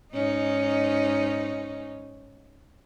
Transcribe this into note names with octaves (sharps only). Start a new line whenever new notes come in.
G#2 C#4 D#4